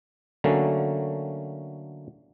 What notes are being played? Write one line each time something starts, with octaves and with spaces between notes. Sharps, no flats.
D3 F#3 A3 A#3 C#4